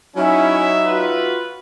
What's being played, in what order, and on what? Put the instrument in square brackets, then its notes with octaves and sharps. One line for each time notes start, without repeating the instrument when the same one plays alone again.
[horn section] F#3 D#4 E5 [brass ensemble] C#4 E4
[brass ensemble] F4 F#4 B4